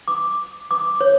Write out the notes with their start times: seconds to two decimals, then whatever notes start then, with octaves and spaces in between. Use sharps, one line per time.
0.08 D6
0.71 D6
1.01 C#5